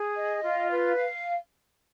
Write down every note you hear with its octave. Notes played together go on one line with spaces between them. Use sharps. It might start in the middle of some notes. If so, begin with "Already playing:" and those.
Already playing: G#4
D#5
F4
B4
F5